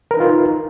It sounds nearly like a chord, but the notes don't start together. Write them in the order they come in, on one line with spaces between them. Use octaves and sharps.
A#4 B4 D#4 F4